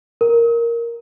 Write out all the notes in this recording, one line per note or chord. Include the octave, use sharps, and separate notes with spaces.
A#4